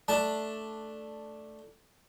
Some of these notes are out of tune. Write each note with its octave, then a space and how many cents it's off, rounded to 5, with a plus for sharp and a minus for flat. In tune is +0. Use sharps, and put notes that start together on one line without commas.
A3 +0 D4 +0 A5 +0